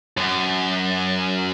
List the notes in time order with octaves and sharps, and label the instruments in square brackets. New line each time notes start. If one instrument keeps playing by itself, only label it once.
[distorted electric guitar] F#2